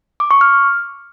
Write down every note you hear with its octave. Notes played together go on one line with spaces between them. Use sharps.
D6
C#6
F6